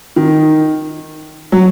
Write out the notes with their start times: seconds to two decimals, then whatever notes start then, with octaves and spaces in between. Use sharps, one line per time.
0.16 D#3
1.52 F#3